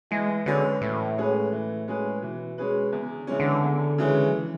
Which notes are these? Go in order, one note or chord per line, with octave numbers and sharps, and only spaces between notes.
E3 G#3
D3 G#3 C#4 G#4 B4
A2 E3
G#3 C#4 G#4 B4
E3
G#3 C#4 G#4 B4
B2 E3
G#3 C#4 G#4 B4
E2 C#3
D3
C#3 E3 G#3 C#4
D3
E2
C#3 E3 G#3 C#4
F#3
E3